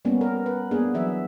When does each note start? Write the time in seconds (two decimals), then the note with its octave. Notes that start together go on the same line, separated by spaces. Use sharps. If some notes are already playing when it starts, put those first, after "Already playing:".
0.05 G3 A#3 B3 C#4
0.21 A#4
0.46 B4
0.71 A#3 B3 D4 G#4
0.94 E3 F#3 E5